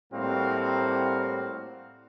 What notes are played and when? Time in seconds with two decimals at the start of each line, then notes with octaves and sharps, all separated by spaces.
0.13 A2 G3 A#3 C4 F#4 F5